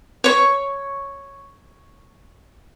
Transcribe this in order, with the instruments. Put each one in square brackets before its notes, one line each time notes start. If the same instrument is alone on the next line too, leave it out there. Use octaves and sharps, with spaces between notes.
[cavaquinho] C#5 C#6